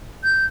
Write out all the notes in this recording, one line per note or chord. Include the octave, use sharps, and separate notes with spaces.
G6